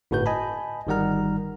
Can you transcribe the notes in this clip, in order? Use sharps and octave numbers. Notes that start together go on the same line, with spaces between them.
G1 A2 F#4 B4 G6
D#5 G#5 A5 B5
G1 D#3 G3 F#5 A#5 F6